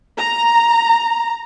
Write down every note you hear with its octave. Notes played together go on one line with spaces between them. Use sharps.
A#5